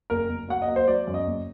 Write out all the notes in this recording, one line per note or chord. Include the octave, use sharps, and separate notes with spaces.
F#1 A#4
F#1
F#3 F#5
D#5
A#3
C5
F#3 D5
F#2
D#5
F#1